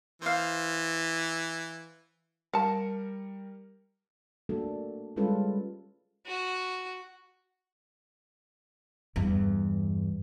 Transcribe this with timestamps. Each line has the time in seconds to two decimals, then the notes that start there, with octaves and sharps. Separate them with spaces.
0.22 E3 C5 F5
2.53 G3 A#4 F5 A5 C#7
4.49 A3 A#3 D4 F#4 A4
5.16 G3 G#3 C#4 F4 A4 B4
6.26 F#4
9.16 E2 G2